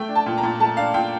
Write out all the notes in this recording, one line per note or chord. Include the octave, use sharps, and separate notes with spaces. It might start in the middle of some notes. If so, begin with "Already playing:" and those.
Already playing: A3 G5
D4
A5
A#2
A#5
A#2
A3 A5
D4 F5
A#2 G5